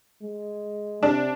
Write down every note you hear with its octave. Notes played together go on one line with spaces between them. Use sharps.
G#3
C3 D4